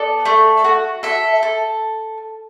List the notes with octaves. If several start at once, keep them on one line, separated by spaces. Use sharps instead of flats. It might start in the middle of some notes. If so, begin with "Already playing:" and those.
Already playing: B3 A4 D5
A3
F#4
A4 E5
A4